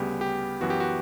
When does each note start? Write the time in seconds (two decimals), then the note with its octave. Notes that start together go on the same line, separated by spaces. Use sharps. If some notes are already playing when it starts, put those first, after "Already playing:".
Already playing: D2 C#3 G3 B3 G4
0.21 G4
0.61 F#2 E3 B3 F#4
0.70 G4
0.80 F#4